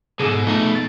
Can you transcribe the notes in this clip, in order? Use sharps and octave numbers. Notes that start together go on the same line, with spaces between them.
B1 G#2 B2 G#4 A4 D#7
F2 A3 D#4
A6 D7